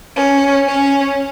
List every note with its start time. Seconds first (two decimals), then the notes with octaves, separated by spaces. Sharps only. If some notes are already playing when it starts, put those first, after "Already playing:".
0.16 C#4
0.68 C#4